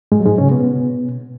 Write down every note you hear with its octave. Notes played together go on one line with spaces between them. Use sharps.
G#2 G#3
F#3
G#2 G#3
C#3 C#4
B2 B3